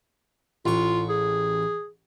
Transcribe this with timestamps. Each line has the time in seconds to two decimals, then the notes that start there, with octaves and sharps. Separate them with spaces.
0.66 A1 F4 C#6
1.09 G#4